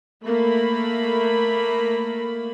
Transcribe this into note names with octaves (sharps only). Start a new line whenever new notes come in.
A3 A#3 B5